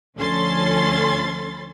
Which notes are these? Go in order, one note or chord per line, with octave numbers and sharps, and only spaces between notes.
D2 F3 C#4 A4 C6 A6